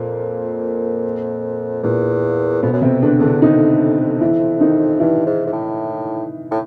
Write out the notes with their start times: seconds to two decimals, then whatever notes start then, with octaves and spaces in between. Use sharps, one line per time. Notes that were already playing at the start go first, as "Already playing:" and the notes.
Already playing: F2 A#2 A#3
1.83 E2 A#2 A#3
2.62 F2 B2 B3
2.73 F#2
2.82 F2 C3 C4
3.02 E2 D3 D4
3.19 E2 D3 D4
3.42 F2 D#3 D#4
4.21 E3 E4
4.60 D#3 D#4
5.00 G2 E3 E4
5.26 G#2
5.47 G#2
5.53 A2
6.51 A2